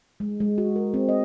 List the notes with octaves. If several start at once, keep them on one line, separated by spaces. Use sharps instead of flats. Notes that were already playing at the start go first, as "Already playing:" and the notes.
G#3
G#3
F#4
A#4
C4
D#5